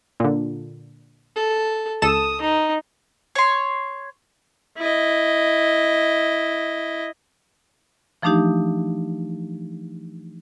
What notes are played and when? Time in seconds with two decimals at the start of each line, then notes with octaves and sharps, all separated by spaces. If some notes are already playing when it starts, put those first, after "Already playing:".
0.20 A#2 D3
1.36 A4
2.02 C#2 A4 D#6 E7
2.41 D#4
3.35 C#5 C6
4.78 E4 D#5
8.22 E3 F3 A3 D4 D#4 G4